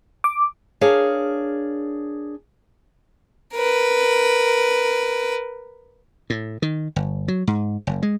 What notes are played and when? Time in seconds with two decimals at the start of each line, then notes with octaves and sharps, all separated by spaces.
0.24 D6
0.81 D4 G#4 A#4 C#5 F5
3.54 A#4 B4
6.30 A2
6.62 D#3
6.96 G1
7.28 F#3
7.47 G#2
7.87 F#1
8.03 G#3